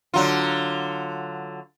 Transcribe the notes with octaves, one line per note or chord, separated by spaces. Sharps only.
D3 F#3 F4